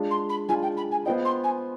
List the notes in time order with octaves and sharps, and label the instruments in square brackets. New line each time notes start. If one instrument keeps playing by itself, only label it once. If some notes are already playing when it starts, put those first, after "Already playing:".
Already playing: [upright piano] G#3 D4 F4
[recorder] C6
B5
[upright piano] G#3 D4 F4 [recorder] G#5
[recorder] G5
B5
G#5
[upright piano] B3 F4 C5 D#5 [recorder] G5
[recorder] C6
G#5